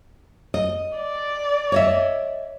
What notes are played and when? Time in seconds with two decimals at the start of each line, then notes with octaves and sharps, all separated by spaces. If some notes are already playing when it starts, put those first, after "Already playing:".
0.54 D#5
0.98 D5
1.72 C#5 D#5 E5